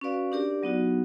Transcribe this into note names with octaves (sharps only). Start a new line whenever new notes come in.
C#4 F#4 B4 D5 F5
D4 G4 A#4 D5
F#3 B3 D#4 F#4